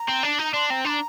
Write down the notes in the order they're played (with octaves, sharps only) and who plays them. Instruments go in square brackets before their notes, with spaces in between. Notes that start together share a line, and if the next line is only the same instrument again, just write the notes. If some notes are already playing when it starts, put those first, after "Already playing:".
Already playing: [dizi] A#5
[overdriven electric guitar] C4
D4
[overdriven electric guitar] D#4 [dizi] A#5
[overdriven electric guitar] D4 [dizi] C6
[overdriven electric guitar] C4 [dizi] A#5
[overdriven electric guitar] D4 [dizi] C6
[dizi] A#5